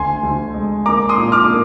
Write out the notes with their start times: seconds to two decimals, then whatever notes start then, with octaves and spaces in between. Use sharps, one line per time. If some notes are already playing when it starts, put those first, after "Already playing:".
Already playing: D2 G#5 C6
0.23 D2
0.54 G#3
0.86 A#3 A#5 D6
1.09 C6 D#6
1.17 A#2
1.32 D6 F6
1.48 A#3